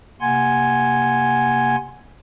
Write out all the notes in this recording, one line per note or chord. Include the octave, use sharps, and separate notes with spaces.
C3 A#3 F#5 G#5 C6 G#6